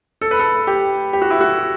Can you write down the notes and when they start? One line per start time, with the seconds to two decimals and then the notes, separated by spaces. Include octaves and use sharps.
0.21 A4
0.31 B4
0.39 A4
0.67 G4
1.13 G4
1.22 F#4
1.30 E4
1.41 F#4